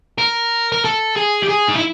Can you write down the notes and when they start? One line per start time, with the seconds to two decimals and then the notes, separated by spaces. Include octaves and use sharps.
0.18 A#4
0.72 A#4
0.85 A4
1.16 G#4
1.43 G4
1.49 G#4
1.68 D#4
1.75 E4